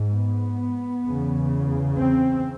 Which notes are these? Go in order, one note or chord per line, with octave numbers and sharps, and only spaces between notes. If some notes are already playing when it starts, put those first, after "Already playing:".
Already playing: G#2
B3
E2 C#3
C4